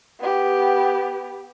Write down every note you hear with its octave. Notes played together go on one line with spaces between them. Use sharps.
B3 G4